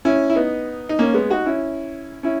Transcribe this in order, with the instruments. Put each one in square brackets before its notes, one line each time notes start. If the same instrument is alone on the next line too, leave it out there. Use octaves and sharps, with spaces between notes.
[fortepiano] C#4 E4
E4
B3 D#4
D#4
A#3 C#4
G#3 B3
D#4 F#4
C#4 E4
C#4 E4